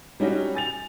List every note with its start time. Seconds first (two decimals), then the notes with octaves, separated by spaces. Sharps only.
0.20 G3 C#4 D#4 F#4 C#5
0.55 G#5 A6 F7